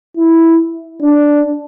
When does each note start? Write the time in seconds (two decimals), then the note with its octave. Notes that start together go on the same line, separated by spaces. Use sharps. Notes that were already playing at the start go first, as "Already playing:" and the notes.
0.17 E4
1.03 D4